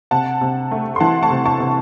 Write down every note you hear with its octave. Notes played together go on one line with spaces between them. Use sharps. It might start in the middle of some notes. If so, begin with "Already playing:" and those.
C3 F#5 A5
C3
A3
C6
E3 F#5 A5
A5 C#6
C3
A5 C#6
C3